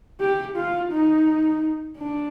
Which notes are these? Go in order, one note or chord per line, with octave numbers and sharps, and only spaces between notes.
G4
F4
D#4
D4